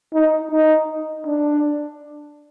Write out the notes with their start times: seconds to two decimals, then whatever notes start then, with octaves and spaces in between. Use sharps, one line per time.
0.14 D#4
0.52 D#4
1.27 D4